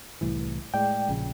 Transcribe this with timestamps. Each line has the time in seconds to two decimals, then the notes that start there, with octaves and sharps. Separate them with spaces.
0.21 C2 A2 E3
0.74 A2 G#3 D5 G5
1.09 A#1 C#3